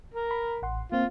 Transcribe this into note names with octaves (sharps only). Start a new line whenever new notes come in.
A#4
B5
A1 F#5 C6
A#3 C4 F4